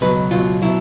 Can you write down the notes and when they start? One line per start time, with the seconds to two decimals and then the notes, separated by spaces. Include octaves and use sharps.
0.01 C#2 B2 F#3 B4
0.31 C#2 B2 F#3 F4
0.62 B2 F#3 E4